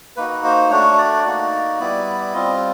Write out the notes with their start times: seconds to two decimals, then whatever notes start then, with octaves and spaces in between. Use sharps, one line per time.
0.16 A#3 D#4 F#4 B4
0.44 C5
0.71 A3 D4 F#4 C#5
0.98 D5
1.26 A#3 D#4 F#4
1.80 G3 B3 E4
2.33 G3 C4 F4 D#5